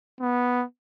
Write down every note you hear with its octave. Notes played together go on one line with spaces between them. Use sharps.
B3